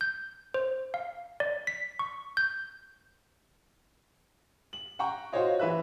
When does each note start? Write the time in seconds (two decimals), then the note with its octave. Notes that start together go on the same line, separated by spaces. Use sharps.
0.01 G6
0.54 C5
0.94 F5
1.40 D5
1.67 B6
1.99 C#6
2.37 G6
4.73 F#7
4.99 F#5 G5 A#5 C#6
5.33 F4 F#4 C5 C#5 D#5
5.59 E3 B4 E5 F#6